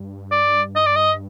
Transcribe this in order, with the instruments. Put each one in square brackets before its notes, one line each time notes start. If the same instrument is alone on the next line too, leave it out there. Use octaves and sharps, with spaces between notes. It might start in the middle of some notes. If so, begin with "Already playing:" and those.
Already playing: [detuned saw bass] G2
[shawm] D5
D#5
D5
D#5